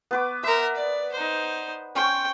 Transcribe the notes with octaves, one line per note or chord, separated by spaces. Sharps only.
B3 B4 D6
A#4 B4 E5
D5
D#4 C5
C#4 C5 G5 C#6